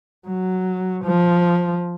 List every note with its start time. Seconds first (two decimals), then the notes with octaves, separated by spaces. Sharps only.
0.27 F#3
1.04 F3